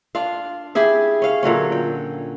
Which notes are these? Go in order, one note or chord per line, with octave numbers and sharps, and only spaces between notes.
D4 F4 F5
E4 G4 G#4 E5
C#4 F5
A#2 D3 F#3 C#4
G5